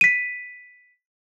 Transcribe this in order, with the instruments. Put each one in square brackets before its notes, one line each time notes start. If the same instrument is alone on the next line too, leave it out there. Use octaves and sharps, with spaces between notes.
[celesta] B6 D#7